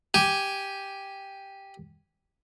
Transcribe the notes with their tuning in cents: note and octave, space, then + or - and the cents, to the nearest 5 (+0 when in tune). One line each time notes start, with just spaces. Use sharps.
G4 +0 G#5 +0